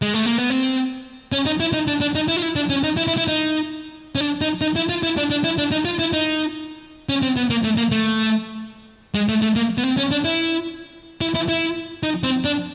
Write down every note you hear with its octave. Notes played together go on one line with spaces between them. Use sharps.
G#3
A3
A#3
B3
C4
C#4
D#4
E4
D#4
D4
D4
D#4
E4
F4
E4
D4
C#4
D#4
E4
E4
E4
D#4
C#4
D4
D#4
D#4
E4
F4
E4
D4
D4
E4
D4
D#4
F4
E4
D#4
C#4
C4
B3
A#3
A3
A#3
A3
G#3
A3
A3
A#3
B3
C4
C#4
D4
E4
E4
E4
E4
D#4
C4
D4